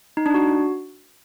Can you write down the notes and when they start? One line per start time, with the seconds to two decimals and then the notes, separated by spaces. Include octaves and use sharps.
0.17 D#4
0.26 D4
0.34 F#4